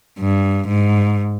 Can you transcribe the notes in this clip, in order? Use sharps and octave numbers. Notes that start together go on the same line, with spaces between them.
G2
G#2